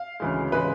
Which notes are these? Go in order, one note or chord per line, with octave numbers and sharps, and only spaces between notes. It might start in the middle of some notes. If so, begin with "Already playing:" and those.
Already playing: F5
D2 C#3 E3 G#3
C#3 E3 G#3 B4